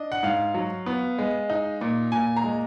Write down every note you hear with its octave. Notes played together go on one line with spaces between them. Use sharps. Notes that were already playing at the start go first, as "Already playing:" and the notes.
Already playing: D4 D#5
F#5
G#2 F5
F#3
B3
G#3
D#4
A#2
A#2 G#5
A#5
G#3